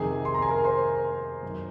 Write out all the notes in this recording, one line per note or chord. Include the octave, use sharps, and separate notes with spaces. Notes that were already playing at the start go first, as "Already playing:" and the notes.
Already playing: F2 C3 D#3 G#4 G#5
C6
A#5
G#5
A#4 A#5
C5 C6
F#2 D#3